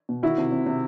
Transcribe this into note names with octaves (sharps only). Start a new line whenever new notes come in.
B2
D#3 E4 F#4
C3
C3
C3